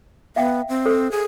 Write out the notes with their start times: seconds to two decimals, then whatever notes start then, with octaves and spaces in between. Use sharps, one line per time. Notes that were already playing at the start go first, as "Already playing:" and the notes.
0.36 B3 E5 F5 G5
0.69 C4
0.86 A4 C5
1.12 G#4